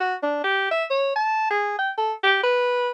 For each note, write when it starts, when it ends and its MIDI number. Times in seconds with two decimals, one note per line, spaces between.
0.01 0.15 66
0.23 0.42 62
0.44 0.69 67
0.71 0.85 76
0.90 1.16 73
1.16 1.50 81
1.51 1.75 68
1.79 1.91 79
1.98 2.13 69
2.23 2.39 67
2.43 2.90 71